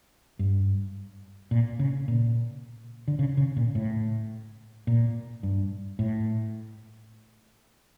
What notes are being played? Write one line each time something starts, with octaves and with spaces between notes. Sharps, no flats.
G2
A#2
C#3
A#2
D3
C#3
C#3
A#2
A2
A#2
G2
A2